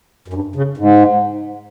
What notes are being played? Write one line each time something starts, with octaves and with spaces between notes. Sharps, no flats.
F#2
G2
C#3
G#2